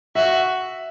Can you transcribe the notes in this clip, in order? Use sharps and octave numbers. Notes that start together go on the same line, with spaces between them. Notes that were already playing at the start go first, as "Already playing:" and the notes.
F#4 E5